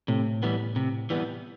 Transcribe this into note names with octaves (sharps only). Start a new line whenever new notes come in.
A2 C3
E3 G3 B3
C3
E3 G3 B3